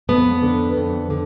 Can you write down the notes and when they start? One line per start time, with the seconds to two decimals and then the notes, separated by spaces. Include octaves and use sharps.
0.09 F2 B3
0.42 D3
0.77 F2
1.10 D3